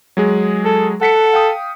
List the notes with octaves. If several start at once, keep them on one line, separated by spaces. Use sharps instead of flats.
F#3 G#3 G#4
A4
A4 F#5 B6 C#7
F5 G5 D#6